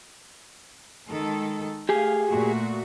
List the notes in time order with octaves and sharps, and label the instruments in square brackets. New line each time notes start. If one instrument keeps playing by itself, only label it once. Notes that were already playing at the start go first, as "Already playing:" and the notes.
[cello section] D#3 G#3 A4
[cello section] A3 F5 [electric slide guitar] G4 G#4
[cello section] A#2 A3 F#4